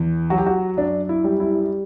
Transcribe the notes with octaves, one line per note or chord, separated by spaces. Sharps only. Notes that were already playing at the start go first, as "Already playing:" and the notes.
Already playing: E2
F#3 F#4
G4
F#4
F#2 D4
E4
G3
E4